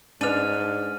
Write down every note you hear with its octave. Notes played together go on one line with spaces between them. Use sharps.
G#2 C#4 D4 B4 F6 D#7